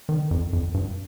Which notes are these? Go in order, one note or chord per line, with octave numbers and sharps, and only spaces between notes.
D#3
F2
F2
G2